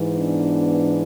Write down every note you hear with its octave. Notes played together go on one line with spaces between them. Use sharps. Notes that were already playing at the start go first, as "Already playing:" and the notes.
Already playing: G#2 E3
B3 D4